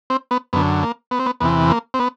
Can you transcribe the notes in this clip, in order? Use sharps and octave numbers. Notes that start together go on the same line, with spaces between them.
C4
B3
F#2 D3 B3
A#3
B3
C4
B3
E2 C3 E3 B3
A#3
C4
B3